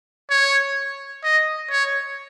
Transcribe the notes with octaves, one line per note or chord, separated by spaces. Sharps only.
C#5
D#5
C#5